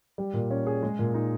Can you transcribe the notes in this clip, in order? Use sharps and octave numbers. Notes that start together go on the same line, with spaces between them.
G3
A#2
C#4
G#4
G#3
A#2
D#4